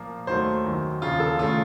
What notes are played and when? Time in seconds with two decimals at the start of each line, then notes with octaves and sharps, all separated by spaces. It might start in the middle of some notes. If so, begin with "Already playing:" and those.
Already playing: A#2 F3 A#3
0.27 D#2 D#3 F#3 A3 C5
0.65 F#2 D#3 F#3
1.02 D#2 C#3 F3 F4
1.20 A4
1.39 D#2 C#3 A3 F4